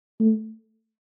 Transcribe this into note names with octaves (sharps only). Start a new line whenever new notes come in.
A3